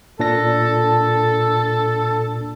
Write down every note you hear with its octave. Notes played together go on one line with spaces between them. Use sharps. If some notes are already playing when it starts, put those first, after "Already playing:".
A#2 D4 A4 A#6